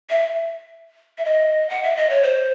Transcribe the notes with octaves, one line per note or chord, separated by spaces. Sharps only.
E5
E5
D#5
F#5
E5
D#5
C#5
C5